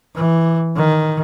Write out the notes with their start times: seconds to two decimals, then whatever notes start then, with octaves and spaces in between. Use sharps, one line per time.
0.15 E3
0.76 D#3